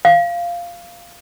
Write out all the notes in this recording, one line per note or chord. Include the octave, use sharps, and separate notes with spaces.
F5